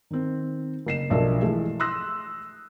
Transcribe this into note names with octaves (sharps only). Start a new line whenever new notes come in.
D#3 C4
F#1 C7 E7
B1 F3 D4 A#4 E5
E3 G#3 A3
C6 D#6 E6 F#6 A#6